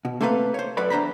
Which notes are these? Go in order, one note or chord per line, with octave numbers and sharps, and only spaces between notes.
B2
A3 A#3 C4 A4 B4 F5
C5 C#5
F#2 A4 B4 D5 B5
E2 D4 C5 A#5 B5